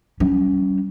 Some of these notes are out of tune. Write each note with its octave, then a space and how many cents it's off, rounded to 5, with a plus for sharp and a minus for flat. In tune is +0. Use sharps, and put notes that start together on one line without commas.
G3 -40 C#4 +10